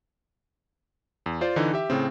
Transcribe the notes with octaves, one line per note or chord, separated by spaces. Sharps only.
E2
F4 C5 D5
D3 E3 D#4
G4 E5
A2 C#3 C4